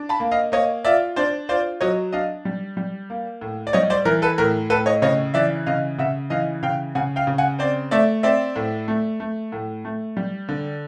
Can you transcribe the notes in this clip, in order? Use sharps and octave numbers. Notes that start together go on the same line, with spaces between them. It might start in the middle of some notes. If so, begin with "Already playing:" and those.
Already playing: D4
A5 B5
A#3
D#5 F5
A#3 C#5 D#5
F4 D5 E5
D4 C5 D5
F4 C5 D5
F#3 C#5 D#5
D4 D#5 F5
G3
G3
A#3
A2
D5
G3 C#5 D#5
C5 D5
E3 A#4
A4 B4
A2 A#4
A2 A4 B4
C#5 D#5
C#3 C#5 D#5
E3 D5 E5
C#3 D#5 F5
C#3 E5 F#5
E3 D#5 F5
C#3 F5 G5
C#3 F#5 G#5
F5 G5
C#3
F#5 G#5
C4 C5 D5
A3 D5 E5
C4 D5 E5
A2
A3
A3
A2
A3
G3
D3